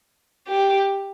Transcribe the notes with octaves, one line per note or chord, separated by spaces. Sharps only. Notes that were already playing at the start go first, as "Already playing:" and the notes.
G4